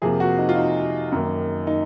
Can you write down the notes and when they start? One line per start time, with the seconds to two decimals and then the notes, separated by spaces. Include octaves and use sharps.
0.02 F2 C3 F3 A#3 G#4
0.20 F#4
0.38 D#4
0.49 F4
0.56 D#4
1.12 F#2 D#3 A#3
1.67 D#4